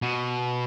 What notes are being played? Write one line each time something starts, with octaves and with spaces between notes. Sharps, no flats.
B2